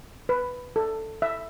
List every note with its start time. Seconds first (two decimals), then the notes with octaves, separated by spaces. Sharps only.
0.29 B4
0.76 A4
1.22 E5